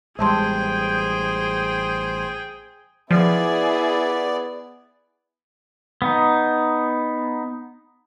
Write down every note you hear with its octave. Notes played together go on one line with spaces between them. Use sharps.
A1 G3 G#3 G#4 C5 G5 A5 C6
F3 B3 E4 G#4 D5
B3 D#4